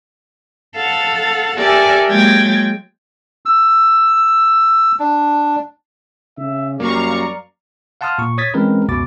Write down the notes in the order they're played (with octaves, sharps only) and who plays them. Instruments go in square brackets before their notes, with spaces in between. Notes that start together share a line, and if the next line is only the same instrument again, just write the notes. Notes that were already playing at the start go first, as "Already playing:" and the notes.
[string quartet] A4 F5 F#5
G4 A4 A#4 D5 E5 G#5
F#3 G#3 A#3 G5 G#6 A6
[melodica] E6
D4
[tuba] C#3 [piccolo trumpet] E5
[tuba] F#2 [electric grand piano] G3 A#3 [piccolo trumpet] D5 [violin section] F5 A#5 C#6
[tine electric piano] F5 F#5 A5 C6 D#6 F6
A#2 C#6
C#5 D#6 G#6 A6 B6
E3 G#3 C4 C#4 A#4 B4
C#2 F#2 B2 D6 A6